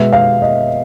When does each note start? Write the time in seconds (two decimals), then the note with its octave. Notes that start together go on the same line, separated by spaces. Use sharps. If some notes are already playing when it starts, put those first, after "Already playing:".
Already playing: B2 G#3 B3 E5
0.13 F5
0.42 D#5